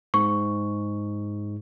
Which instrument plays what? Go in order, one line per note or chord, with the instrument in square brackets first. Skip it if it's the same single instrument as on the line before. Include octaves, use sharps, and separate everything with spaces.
[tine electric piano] G#2 [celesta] C#6